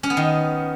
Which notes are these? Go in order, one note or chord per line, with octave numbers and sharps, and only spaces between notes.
C#4
B3
D#3